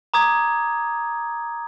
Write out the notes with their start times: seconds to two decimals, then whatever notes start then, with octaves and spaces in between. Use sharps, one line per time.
0.14 A#5 D6 D#6 G#6